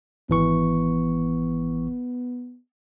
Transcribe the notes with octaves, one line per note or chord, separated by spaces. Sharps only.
G#1 E3 B3 C#6